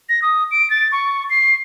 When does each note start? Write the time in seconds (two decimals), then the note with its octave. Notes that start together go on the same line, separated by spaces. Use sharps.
0.09 A#6
0.22 D#6
0.51 D7
0.70 A6
0.92 C#6
1.30 C7